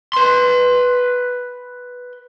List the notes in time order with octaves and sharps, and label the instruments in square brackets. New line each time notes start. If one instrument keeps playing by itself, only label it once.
[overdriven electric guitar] B4 C6